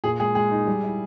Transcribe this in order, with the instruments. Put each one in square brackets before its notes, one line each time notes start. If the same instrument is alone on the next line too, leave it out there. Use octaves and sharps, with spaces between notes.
[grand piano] A#2 [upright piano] G#4
[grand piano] G#3 [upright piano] G#4
[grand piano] G#3 [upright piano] G#4
[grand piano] D#4
G3
E4